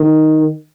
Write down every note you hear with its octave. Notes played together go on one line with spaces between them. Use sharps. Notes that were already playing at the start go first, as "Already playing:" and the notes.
Already playing: D#3